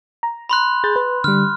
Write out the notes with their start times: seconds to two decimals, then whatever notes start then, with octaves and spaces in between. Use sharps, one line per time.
0.23 A#5
0.49 B5 C6 F#6
0.84 G#4 G6 A6
0.96 B4
1.24 D3 G3 F6